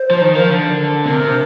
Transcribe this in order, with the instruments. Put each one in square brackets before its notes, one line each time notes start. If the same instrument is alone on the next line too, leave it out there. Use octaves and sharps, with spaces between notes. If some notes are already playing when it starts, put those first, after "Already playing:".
Already playing: [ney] C5
[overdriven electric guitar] F3
D#3
[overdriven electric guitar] F3 [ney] A#4
[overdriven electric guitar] D3
[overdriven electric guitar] C3 [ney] A#4
[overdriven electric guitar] C3